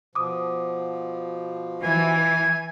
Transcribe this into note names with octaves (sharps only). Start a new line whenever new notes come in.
B2 F3 D6 D#6
E3 G#5